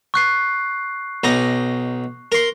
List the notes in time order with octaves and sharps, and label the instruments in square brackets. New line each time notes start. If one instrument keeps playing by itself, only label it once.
[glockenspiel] C#6 F#6 C7
[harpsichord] B1 D#4 A#5
A#4 C6